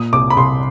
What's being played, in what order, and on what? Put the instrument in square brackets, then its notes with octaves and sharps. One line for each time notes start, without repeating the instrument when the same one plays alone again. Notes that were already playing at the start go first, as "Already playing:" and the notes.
Already playing: [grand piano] A#2 D#6
C2 D6
B5
C2 C6